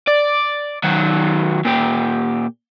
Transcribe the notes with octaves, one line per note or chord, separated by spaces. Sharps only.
D5
D#3 F#3
A#2 G4